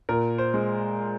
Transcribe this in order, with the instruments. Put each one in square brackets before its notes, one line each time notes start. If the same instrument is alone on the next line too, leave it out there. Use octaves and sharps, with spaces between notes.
[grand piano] A#2 A#4
C5
G#3